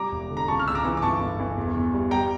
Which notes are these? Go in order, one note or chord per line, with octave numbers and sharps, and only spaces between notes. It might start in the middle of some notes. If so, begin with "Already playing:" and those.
Already playing: G3 A#5 D6
E1
D3
A#5
C#2 A5 C#6
F6
C#2 E6
A#5 D6
E3
D6
G1 A5 C#6
G1
E3
E2
E2
G3
G3 G5 A#5